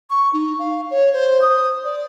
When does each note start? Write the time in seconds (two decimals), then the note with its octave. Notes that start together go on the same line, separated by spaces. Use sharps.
0.10 C#6
0.33 D#4
0.59 F5
0.91 C#5
1.13 C5
1.42 D#6
1.84 D5